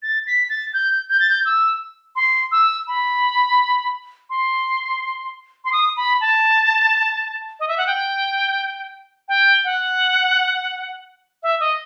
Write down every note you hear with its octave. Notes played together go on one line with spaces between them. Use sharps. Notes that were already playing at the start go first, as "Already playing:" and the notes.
A6
B6
A6
G6
G6
A6
G6
E6
C6
E6
B5
C6
C6
D#6
B5
A5
D#5
E5
F#5
G5
G5
F#5
E5
D#5